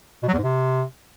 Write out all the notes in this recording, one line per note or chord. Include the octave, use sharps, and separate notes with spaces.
B2
F#3
E2
G#2
C3